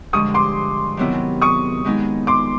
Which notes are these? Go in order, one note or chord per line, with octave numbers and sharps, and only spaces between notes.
G2 D3 F3 G#3 C#6 D#6
C6 D6
C3 D#3 F#3 B3 E4
C#6 D#6
D#3 G#3 B3 D#4 G#4
C6 D6